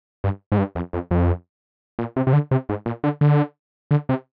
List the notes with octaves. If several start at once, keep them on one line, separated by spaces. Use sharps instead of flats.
G2
G#2
G2
F2
F2
F2
A#2
C3
C3
D3
C3
G#2
A#2
D3
D3
D3
C3